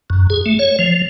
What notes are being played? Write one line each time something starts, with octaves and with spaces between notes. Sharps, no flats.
F#2
G#4
A3
C#5
F3